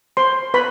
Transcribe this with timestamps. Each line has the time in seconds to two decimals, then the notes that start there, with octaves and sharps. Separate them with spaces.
0.17 C5 C6
0.54 B4 B5